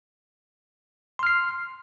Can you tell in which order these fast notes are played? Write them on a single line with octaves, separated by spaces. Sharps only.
C6 F6 C7